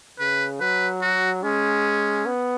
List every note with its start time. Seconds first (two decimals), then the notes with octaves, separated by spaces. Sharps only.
0.19 C#3 B4
0.60 F#3 B4
1.02 F#4
1.43 G#3 C#4
2.26 B3